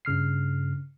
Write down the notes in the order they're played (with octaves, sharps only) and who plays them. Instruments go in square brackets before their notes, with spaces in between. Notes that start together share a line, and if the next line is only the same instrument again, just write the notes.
[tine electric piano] G2 C#3 F6 C7